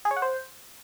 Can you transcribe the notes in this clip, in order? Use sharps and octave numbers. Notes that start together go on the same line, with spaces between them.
G#4
C#5
F#5
C5